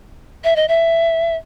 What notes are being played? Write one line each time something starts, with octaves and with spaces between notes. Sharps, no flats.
E5
D#5
E5